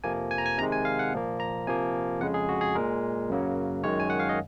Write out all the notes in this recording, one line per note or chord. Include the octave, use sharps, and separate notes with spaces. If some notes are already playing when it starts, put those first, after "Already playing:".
F2 C3 F3 A#3 G#5
G#5
A#5
G#5
C3 D#3 G#3 A#5
G#5
F5
F#5
A#2 F3 A#3
A#5
C3 F3 A#3 G#5
F2 C#3 G#3 F#5
G#4
F#4
G#4
A#2 G#3 A#4
F#2 C#3 F#3 A#3
F#2 D#3 G#3 C#5
G#5
F#5
F5
D#5